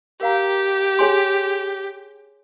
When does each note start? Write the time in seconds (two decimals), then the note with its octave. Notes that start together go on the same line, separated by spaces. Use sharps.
0.21 G4 A#4 F5 A#5
0.99 G#4 C#5 G#5 C6